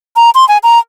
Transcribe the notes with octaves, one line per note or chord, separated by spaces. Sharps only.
A#5
C6
G#5
A#5